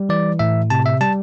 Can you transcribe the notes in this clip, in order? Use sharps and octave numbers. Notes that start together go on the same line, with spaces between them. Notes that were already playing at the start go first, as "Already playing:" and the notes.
Already playing: G3
E3 D5
A2 E5
C3 A5
E5
G3 A5